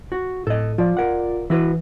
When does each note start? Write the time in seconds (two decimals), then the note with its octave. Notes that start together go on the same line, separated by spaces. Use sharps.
0.12 F#4
0.47 A2 A4 D#5
0.78 F3 F4 D5
0.97 A#4 F#5
1.50 E3 E4 F#4 B4